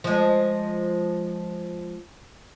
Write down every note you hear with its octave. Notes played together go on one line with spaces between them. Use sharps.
F3 G#3